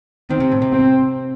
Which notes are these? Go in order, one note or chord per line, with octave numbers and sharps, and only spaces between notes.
D#3 C4
C3
A2
C3
C4